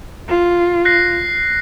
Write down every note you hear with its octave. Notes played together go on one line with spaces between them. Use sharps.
F4
F#6 A#6 C7